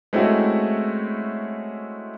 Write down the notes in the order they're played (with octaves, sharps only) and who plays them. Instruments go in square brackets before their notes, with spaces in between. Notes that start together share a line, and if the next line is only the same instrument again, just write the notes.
[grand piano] G#3 A3 C4 C#4 E4 F#4